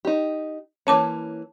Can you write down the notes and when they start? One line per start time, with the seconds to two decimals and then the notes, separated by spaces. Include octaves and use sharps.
0.05 D#4 G4
0.87 E3 A#3 C#4 C#5 A5 D6